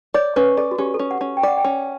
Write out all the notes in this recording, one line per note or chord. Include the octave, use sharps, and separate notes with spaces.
C#5 D5
C#4 B4
A4 D5
F#4
C#4 G4
A4
C#4
F#5
C#4
G5
D5 F#5
G5
C#4